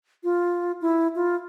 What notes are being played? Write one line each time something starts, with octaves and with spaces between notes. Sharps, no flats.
F4
E4
F4